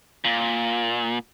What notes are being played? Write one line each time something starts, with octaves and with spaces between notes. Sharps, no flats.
A#2